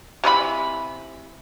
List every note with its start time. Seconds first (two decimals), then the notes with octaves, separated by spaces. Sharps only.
0.24 C3 E3 E4 B5